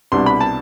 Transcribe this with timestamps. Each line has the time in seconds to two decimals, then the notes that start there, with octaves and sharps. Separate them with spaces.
0.12 C2 B2 G3 B3 D4 C6
0.26 B5
0.41 A5